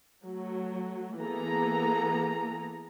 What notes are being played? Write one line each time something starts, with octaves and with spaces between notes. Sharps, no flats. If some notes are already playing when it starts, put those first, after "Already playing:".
F#3 A3
E3 A#3 B3 G#4 A4 A#5